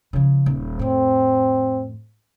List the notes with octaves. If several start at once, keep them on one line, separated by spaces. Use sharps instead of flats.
C#3 F3
D#1
F2 A2 C4